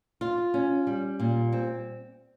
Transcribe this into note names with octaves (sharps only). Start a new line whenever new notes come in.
F4
C#4
G3
A#2
C4